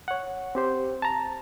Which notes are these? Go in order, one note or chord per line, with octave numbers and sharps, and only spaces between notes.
C#5 F#5
C4 G4 C5
A5 A#5